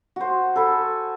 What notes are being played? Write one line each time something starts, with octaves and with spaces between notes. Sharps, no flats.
F#4 C5
A4 G#5 B5